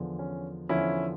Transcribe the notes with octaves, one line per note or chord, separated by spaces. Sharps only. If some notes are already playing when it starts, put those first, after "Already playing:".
Already playing: E2 D3 F3
C#4
E2 D3 F3 C#4 E4